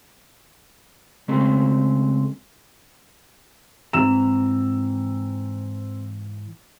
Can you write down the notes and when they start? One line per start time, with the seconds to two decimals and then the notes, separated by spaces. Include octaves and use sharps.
1.28 C#3 G#3 A3 C4
3.93 G#2 E3 C4 A#5 E6 E7